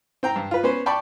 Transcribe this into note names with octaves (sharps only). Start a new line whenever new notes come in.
C4 G5 A#5
G2
F4 B4
B3 C#4 B4 C5
D5 G5 A5 B5 C#6